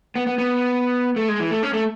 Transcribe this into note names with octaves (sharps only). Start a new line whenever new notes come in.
B3
B3
B3
A3
G#3
E3
A3
C#4
A3